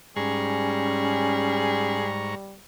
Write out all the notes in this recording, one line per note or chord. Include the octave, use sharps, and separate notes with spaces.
G#2 G3 C#4 G#4 A#5 C#6